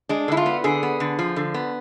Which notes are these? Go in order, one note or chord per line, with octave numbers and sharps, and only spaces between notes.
G#3 D4
D3 E4
F4
B3
D3 G#4
B3
D3
F3
D3
B3